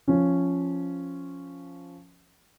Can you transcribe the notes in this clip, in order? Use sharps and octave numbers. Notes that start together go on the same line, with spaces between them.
F3 C#4